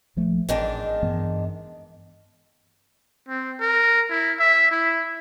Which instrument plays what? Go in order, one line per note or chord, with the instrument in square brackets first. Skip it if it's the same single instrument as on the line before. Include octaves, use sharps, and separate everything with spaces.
[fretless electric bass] A#1 F3 A3
[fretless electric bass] A1 [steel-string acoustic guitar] G#2 D#3 D4
[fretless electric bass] G2 E3 B3
[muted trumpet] C4
A#4
E4
E5
E4